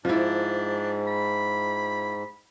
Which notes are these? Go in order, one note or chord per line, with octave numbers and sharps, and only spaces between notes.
G#2 F3 D4 E4
B5